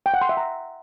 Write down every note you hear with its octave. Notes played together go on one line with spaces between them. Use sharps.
G5
F#5
C6
E5
A#5